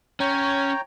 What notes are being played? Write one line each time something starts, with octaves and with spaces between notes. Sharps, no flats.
C#4 C#5 G5 A#5